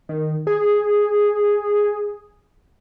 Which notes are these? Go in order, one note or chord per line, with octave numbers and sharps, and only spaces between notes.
D#3
G#4